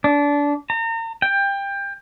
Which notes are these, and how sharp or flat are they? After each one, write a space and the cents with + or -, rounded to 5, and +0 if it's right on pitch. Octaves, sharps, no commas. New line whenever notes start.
D4 -25
A#5 -35
G5 +20